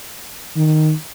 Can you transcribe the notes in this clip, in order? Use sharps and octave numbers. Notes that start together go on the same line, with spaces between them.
D#3